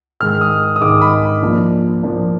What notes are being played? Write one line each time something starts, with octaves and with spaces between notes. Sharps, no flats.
G#2 D#3 G#3 F6
D#6
D#6
G#2 D#3 G#3 D6
B5
A#2 F3 A#3 D4
A#2 F3 A#3 D4